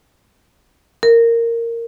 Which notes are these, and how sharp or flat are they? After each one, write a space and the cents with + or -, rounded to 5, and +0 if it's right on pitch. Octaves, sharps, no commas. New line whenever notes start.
A#4 -10